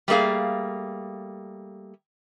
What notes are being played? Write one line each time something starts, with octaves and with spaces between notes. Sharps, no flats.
G3 A3 A#3 G#4 F5